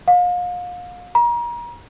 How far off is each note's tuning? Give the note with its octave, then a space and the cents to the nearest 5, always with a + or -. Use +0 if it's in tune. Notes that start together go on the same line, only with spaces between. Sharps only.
F5 +35
A#5 +35